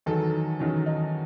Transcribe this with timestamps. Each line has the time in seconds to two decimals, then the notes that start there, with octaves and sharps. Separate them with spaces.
0.06 E2 D#3 F#3 A4
0.59 E2 D#3 F#3 C#4
0.86 D#4